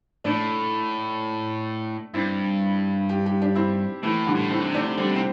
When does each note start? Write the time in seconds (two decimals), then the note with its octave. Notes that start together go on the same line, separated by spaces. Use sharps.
0.24 A2 A3 D4
2.14 G2 C4 E4
3.09 G4
3.26 G4
3.42 D4 G4
3.55 C4 E4
4.03 A2 E3 A3
4.27 D3 G3
4.35 A2
4.51 C4 E4
4.59 D3
4.67 C3
4.74 A3 D4
4.97 D3 G3 C4
5.10 C3
5.16 C4